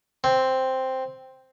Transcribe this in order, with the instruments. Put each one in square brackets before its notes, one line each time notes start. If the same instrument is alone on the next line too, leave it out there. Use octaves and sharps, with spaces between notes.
[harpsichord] C4